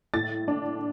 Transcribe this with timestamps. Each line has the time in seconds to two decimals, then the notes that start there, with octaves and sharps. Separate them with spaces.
0.14 A2 A6
0.48 D4